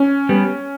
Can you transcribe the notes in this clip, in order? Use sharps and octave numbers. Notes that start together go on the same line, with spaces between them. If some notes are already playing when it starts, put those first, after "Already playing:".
Already playing: C#4
G3 B3